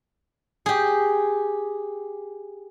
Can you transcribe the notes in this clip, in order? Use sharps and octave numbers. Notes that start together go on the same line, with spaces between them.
G4 G#4